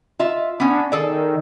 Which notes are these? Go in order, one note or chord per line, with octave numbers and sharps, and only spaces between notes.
F4 D#5 E5
B3 C#4 D4
D#3 G#4 A4 D5